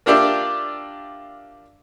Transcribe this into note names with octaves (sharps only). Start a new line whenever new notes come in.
A#3 D4 F4 G4 D5 E5